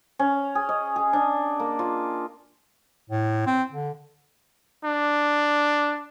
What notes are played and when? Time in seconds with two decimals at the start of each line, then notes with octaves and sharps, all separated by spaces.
0.19 C#4
0.55 G#4
0.69 D#5
0.96 G#4
1.13 D4
1.60 A#3
1.79 F4
3.10 A2
3.47 C4
3.72 D3
4.85 D4